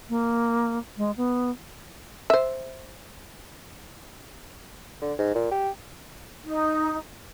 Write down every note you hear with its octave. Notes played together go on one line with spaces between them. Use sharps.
A#3
G#3
B3
C5 E5
D3
G#2
A#2
G4
D#4